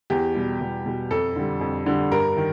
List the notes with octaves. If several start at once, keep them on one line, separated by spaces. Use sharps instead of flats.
E2 G4
B2 G3
E2
B2 G3
F2 A4
D3 G3
F2
D3 G3
G2 A#4
D#3